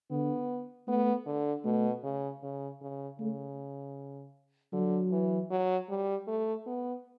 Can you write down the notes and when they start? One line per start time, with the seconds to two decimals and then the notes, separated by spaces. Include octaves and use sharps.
0.11 D3 B3
0.88 A3 B3
1.26 D3
1.65 B2 A3
2.03 C#3
2.43 C#3
2.81 C#3
3.19 C#3 A3
4.73 D3 F#3
5.12 E3
5.50 F#3
5.89 G3
6.27 A3
6.66 B3